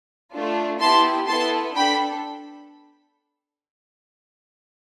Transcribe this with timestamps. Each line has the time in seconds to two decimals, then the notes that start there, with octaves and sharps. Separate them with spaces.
0.33 A3 D4 F4
0.80 B3 E4 G4 A5 C6
1.28 B3 E4 A4 A5 C6
1.75 D4 A4 G5 B5